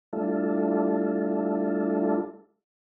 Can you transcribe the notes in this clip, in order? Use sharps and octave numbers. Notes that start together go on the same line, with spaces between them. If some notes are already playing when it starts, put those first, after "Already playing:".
G3 A3 D4 E4 F4 A4